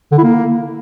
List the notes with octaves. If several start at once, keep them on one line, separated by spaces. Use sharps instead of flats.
D3
E4
A#3